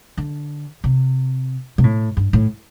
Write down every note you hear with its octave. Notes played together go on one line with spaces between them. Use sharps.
D3
C3
C3
A2
G2
A2